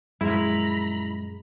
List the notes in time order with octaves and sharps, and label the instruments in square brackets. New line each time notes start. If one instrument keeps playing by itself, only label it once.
[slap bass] F#2 A#2 F3 [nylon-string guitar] G#3 [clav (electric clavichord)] E4 [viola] A#5 B5